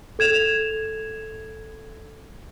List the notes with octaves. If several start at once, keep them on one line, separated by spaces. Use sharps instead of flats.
A4 G#6 E7 F7